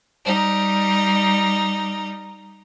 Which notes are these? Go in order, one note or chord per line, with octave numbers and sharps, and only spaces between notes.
G3 D#4